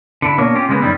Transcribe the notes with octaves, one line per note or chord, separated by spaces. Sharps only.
D3 E4
B2 A#3 D4 A#4 C#5 D#5
C#4 F4 G4
C#3 G#3 A#3 B3
F#2 D#3 G3 E4